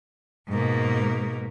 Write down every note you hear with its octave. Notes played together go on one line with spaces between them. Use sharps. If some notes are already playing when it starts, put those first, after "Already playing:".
G#2 B2 A#3